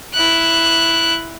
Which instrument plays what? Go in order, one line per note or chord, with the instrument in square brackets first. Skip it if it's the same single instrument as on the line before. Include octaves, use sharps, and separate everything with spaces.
[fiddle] E4 F#6